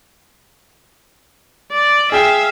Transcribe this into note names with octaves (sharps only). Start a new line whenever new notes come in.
D5
G#4 E5 F5 G5